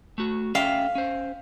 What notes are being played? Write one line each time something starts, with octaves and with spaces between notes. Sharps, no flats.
A3 F#4
C#4 E5 F5 G5
C#4 C5